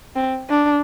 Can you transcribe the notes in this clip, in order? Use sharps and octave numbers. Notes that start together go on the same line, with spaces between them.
C4
D4